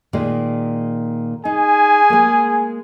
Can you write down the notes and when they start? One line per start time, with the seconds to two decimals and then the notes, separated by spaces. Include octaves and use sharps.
0.13 A#2 D#3 G#3
1.45 D#4 G#4 G#5
2.10 G#3 A#3